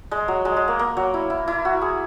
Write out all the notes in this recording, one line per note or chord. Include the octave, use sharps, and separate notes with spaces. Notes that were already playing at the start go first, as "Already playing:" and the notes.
G#3
F#3
G#3
G#3
A#3
A#3
F#3
E4
E4
E4
F#4
G#4